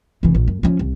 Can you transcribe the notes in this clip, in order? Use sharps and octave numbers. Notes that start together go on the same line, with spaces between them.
F1 E3
A#1
F#2
F3 C#4
C2